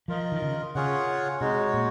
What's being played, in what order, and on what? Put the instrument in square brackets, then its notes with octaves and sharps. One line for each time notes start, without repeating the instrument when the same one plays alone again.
[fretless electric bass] F3 [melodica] F4 A#4 D#5
[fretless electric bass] D#3
C#3
[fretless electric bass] C#3 [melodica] F4 G#4 C#5 F#5
[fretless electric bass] C3 [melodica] G#3 D#4 F#4 C#5
[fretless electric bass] A#2